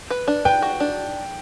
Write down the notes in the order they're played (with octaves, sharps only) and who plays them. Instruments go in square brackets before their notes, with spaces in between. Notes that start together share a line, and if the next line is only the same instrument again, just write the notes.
[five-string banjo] B4
D4
[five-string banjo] B4 [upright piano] G5
[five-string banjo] F#4
D4